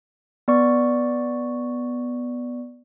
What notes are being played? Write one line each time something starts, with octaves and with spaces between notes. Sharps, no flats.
B3 D5 C#6